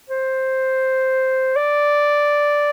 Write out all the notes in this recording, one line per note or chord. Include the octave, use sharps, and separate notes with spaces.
C5
D5